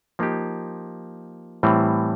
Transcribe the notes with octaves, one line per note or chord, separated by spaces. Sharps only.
F3 A#3 D#4 G4
A2 E3 G3 C4